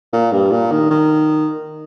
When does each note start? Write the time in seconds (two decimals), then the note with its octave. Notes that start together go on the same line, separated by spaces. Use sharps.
0.13 A#2
0.32 G2
0.51 A#2
0.71 D#3
0.90 D#3